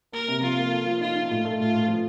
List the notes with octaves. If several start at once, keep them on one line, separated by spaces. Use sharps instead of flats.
A#3 A#4
C3
F3 F4
A#3
A4
F3
D#4 F4
D#4
A2 F4
A3
A2 F4
A2
F3